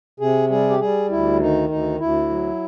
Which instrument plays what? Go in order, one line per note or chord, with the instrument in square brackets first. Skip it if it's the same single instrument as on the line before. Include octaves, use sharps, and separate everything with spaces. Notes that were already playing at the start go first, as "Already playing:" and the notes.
[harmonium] C3 G#4
G3 G#4
G4
G3 G#4
D2 E4
D#3 D#4
D2 D#4
D2 E4
F#3